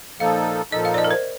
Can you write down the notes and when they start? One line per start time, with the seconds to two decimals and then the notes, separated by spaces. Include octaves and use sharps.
0.20 A#2 F3 A#3 D#4 A4 F5
0.72 A#2 F3 A#3 D#4 A4 D#5
0.85 F5
0.94 D5
0.98 D#5
1.04 A#4
1.11 C5